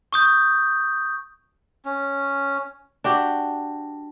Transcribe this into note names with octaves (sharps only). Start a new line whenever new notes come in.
C#6 D#6 G6
C#4
D4 F#4 G4